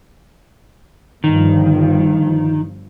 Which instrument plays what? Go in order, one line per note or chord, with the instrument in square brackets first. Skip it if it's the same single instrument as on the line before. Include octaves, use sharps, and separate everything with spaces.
[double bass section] G1 G2 F3 [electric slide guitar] D#3